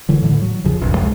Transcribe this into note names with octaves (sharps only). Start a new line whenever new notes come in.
D3 E3 F#3
A2 D3
F#3
E2 C#3 F3
F1 B1 F#2
C#2 F#2 G#3